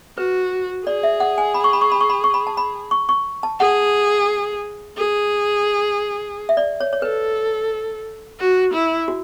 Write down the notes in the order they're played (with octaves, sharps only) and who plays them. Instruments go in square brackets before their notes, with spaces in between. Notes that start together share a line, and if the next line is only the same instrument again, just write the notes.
[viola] F#4 [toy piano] B4
[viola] G#4 [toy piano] D5
[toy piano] E5
F#5
G#5
B5
C#6
B5
C#6
B5
C#6
B5
C#6
B5
A5
B5
C#6
C#6
A5
[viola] G#4 [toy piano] F#5
[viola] G#4
[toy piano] E5
D5
C#5
C#5
[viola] A4 [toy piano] B4
[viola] F#4
E4
[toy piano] F#4